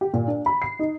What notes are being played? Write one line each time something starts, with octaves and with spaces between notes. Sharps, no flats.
G4
A#2
D4
B5
C7
D#4